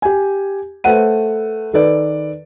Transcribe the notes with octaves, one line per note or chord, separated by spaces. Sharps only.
G4 G#5
A3 B4 C5 F#5 D#7
D#3 A4 B4 D5